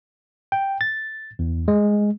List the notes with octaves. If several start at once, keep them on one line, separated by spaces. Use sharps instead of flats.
G5
A6
E2
G#3